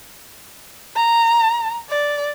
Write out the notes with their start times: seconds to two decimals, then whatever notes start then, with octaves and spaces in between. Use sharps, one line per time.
0.96 A#5
1.89 D5